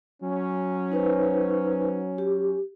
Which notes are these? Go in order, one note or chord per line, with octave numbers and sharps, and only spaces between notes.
F#3 C#4
D#4 B4 C5
G4